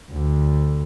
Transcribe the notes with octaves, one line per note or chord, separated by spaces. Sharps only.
D2 D3